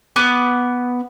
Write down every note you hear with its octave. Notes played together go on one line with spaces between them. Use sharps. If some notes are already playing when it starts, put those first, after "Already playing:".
B3 B4 B5 D6